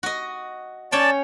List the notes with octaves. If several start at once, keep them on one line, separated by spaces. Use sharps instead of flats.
F#4 D#5
C#4 C#5 D5 G5 A5